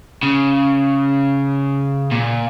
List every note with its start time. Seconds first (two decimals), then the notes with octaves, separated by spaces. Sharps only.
0.23 C#3
2.11 A#2